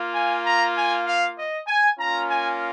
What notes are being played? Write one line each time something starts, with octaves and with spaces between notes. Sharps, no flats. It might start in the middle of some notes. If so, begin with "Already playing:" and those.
Already playing: A#3 F4
G#5
A#5
G#5
F5
D#5
G#5
A#3 C#4 F4 A#5
G#5